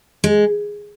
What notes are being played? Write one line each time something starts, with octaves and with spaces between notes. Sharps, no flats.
G#3